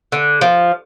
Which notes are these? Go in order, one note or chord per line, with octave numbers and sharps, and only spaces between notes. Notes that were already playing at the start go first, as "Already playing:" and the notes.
D3
F3